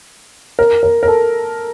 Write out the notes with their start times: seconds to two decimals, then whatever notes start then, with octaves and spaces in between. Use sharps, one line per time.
0.59 A#4
0.83 A#4
1.03 A#4
1.08 A4